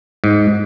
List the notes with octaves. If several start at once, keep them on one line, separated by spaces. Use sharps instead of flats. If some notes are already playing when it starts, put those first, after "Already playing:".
G#2